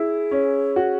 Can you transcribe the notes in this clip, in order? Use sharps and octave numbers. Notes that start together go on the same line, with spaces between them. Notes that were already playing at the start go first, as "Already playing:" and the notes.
Already playing: E4 G#4
C#4
F#4